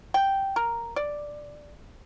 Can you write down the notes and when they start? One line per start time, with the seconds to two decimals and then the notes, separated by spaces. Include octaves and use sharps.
0.14 G5
0.56 A#4
0.96 D5